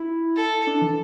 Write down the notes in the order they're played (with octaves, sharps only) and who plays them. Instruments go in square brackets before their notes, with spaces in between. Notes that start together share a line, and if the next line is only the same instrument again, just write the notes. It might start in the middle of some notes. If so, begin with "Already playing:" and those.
Already playing: [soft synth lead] E4
[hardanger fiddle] A4
[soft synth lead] D4
E3